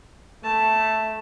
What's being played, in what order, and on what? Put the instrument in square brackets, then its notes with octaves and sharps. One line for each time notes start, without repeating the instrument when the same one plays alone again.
[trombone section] A3 [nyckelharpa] A5